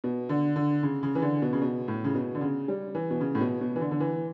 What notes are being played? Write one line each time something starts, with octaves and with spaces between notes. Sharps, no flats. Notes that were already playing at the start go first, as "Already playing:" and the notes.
B2
D3
D3
C#3
C#3
E3
D3
B2
C#3
B2
A2
C#3
B2
D3
C#3
G3
E3
B2
C#3
A2
B2
B2
E3
D3
D3
E3